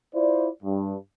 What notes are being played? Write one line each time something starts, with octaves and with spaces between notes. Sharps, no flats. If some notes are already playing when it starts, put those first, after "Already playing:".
E4 F4 C5 D5
G2